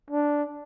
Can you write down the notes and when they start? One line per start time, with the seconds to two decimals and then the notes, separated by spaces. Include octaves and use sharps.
0.10 D4